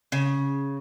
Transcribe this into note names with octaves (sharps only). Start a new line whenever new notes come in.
C#3